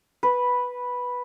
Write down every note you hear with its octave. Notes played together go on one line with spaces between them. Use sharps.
B4